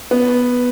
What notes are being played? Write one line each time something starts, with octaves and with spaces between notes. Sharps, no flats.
B3